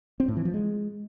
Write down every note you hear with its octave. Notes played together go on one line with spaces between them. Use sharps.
C4
A2
E3
F3
G#3